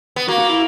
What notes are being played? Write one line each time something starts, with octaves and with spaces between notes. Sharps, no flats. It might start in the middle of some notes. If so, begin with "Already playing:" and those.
B3
A#3 F#4
F#4
E4